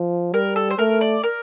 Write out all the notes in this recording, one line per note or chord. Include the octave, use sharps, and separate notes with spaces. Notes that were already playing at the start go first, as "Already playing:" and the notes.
Already playing: F3
G3 A#4
A4
C5
A3 A#4
D5
A#4